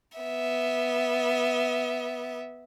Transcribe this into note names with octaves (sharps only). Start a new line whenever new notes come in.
B3 E5